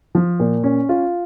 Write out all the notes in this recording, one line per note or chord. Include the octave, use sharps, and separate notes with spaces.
F3
A#2
C#4
F4